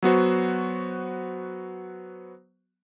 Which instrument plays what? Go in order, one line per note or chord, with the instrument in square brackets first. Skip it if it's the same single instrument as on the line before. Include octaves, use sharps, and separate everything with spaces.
[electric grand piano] F#3 B3 F#4 C5